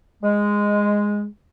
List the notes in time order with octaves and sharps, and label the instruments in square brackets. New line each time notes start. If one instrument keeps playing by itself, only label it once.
[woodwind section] G#3